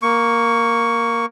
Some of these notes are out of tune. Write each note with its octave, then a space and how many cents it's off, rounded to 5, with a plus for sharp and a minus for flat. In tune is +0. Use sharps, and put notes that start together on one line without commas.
A#3 +0 C#6 +10